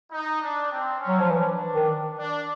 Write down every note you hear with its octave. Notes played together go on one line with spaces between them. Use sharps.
D#4
D4
C4
C#4
F#3
F3
E3 D4
D#3
D4